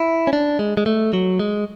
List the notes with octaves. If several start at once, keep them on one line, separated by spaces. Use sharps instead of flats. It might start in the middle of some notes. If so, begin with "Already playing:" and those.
Already playing: E4
C#4
D4
G#3
G#3
A3
F#3
G#3